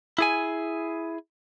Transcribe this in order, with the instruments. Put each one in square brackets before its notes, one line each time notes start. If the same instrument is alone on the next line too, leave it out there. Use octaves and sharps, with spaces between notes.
[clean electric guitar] E4 G#4 G#5